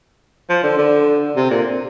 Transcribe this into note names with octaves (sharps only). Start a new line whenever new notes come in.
F3
D3
D3
C3
A#2